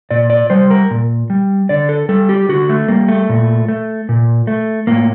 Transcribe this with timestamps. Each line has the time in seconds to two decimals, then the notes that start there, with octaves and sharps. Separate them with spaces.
0.11 A#2 D5
0.30 D5
0.50 G3 C5
0.70 A#4
0.91 A#2
1.30 G3
1.69 D3 D5
1.89 A4
2.09 G3 A4
2.29 G4
2.49 D3 F#4
2.69 A3
2.88 G3 A#3
3.08 A3
3.29 A#2
3.68 A3
4.09 A#2
4.47 A3
4.87 A2 A#3